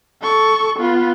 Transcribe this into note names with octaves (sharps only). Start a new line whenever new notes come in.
A4 C#6
B3 F4